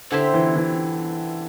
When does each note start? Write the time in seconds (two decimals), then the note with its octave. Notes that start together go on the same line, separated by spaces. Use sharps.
0.11 D3 C4 E4 G4 C5
0.34 E3
0.56 E3